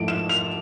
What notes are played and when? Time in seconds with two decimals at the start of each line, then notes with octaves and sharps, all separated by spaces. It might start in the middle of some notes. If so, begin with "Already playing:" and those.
Already playing: G#2 F3 A3 E4 D7
0.08 E7
0.29 F7